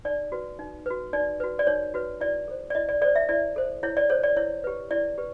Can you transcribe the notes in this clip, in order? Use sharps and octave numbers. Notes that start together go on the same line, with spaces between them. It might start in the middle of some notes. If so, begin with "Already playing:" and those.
D#4 D5
F#4 B4
D#4
F#4 B4
D#4 D5
F#4 B4
D5
D#4 C#5
F#4 B4
E4 D5
A4 C5
D5
E4 D#5
D5
A4 C5 D5
E5
E4 D5
A4 C5
E4 C#5
D5
A4 C5 C#5
D5
E4 C#5
G4 B4
E4 D5
G4 B4